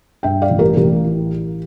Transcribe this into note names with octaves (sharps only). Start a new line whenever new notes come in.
G2 E5 G5
D5 F5
A1
G4 A#4
A1 G4 A#4
E3